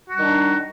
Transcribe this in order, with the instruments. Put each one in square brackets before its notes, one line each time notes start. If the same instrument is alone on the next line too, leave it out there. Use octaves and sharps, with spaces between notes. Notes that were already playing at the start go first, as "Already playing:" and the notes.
[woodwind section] F#4
G3
D#3
D4
D#4